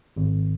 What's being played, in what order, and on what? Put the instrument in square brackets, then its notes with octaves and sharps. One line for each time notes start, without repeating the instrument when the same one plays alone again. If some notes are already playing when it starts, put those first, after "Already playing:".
[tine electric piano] G#1